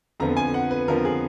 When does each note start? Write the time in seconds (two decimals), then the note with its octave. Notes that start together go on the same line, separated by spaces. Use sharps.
0.20 F2 D3 F3 B3 A#5
0.37 G#5
0.54 F#5
0.71 B4
0.88 F2 D3 F3 B3 A#4
1.05 G#4